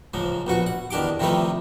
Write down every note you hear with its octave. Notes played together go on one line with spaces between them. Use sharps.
C#2 G#2 F3
A#1 B2 F#4 C#6
F#5
E2 D#3 D4 G4 D6
C3 D#3 F3 G3 A3 B4